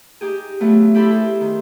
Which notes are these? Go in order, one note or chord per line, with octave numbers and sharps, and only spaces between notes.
D#4 G4 G#4
F#3 A3 B3 F4
E4 G4 A4 B5 C6
G#4 A4 C5
D#3